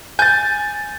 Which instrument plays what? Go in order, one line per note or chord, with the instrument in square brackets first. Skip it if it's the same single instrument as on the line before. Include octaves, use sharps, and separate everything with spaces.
[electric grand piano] G#5 A6 [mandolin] G6